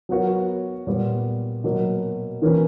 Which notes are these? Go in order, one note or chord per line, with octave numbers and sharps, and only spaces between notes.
F#3 B3 F#4 A#4 C#5
A#2 G3 B3
B2 F#3 A#3
E3 A#3 C#4 E4 B4